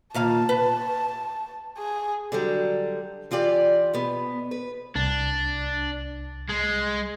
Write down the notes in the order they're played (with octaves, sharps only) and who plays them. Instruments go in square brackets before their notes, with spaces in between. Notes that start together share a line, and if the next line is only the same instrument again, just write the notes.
[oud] D#2 A#2 F5 [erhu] A5
[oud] B4
[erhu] G#4
[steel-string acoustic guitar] D3 F#3 G3
E3 F4 G4 D5
B2 B3
B4
[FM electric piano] C2 [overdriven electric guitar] D4
[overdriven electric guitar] G#3